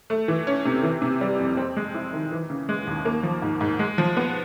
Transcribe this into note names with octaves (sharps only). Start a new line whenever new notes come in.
A3
E3
C#4
C3
E3
C3
G3
F2
C4
G#3
E4
D#3
E3
C#3
G#3
D#2
A#3
F3
G#2
G#2
G#3
F3
B3